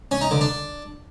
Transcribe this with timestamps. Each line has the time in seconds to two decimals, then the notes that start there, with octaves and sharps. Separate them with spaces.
0.11 C#4
0.21 D#4
0.31 D3
0.41 D4